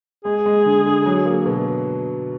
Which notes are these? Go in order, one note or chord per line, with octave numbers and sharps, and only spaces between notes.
G#3 G#4
G#3
D3
D3
F#3
A#3
B2